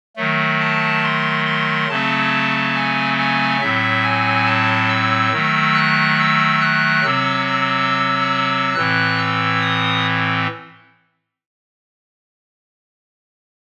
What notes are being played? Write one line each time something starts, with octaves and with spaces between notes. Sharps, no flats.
D#3 F#3 A3
A5
C6
C6
C#3 F#3 A3 C4 A5
G#5
G#5
A2 F#3 C4 E5
G#5
A5
E6
D#3 F#3 A3
F#6
E6
F#6
C3 F#3 C4 E6
E6
A2 E3 C4 F#6
E6
D#6